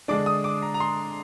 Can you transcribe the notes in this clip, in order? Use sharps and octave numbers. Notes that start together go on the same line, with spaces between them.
D3 G#3 D4 D6
D#6
D6
A#5
A#5
C6